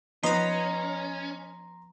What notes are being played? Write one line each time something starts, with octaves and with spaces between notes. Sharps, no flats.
F3 B3 C#4 D#4 B4 A#5 C6